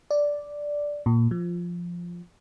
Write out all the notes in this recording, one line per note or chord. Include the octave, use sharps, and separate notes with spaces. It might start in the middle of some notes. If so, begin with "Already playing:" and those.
D5
A#2
F3